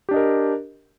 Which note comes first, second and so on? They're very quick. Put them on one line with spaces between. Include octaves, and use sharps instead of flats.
G4 D4 D#5 A#4